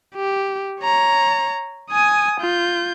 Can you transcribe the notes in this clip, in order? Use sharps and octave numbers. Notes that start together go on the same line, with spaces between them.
G4
C#5 A#5
G#5 D#6
F4 G6